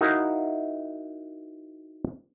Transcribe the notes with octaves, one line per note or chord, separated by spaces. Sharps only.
D#4 E4 F#4 A#4 E5 F5